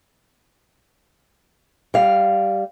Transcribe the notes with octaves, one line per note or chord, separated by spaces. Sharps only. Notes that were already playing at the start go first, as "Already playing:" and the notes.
G3 F5